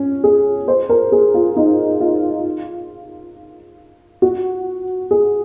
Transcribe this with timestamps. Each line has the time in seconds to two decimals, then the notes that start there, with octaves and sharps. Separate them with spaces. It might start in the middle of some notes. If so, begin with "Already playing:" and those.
Already playing: C#4
0.24 G#4
0.68 C5
0.89 A#4
1.12 G#4
1.34 F4
1.56 D#4
2.00 F4
4.22 F#4
5.11 G#4